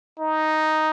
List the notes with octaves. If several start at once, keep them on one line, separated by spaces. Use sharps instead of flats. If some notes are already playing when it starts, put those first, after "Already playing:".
D#4